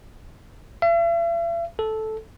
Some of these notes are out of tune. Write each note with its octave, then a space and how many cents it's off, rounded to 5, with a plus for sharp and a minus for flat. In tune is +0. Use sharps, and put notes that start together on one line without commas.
E5 +45
A4 -10